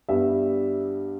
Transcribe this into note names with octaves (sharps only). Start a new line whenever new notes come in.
G2 G3 B3 E5